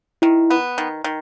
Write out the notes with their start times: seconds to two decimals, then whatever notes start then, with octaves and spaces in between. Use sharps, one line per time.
0.22 D#3 E4
0.50 B3
0.78 D#3
1.04 D#3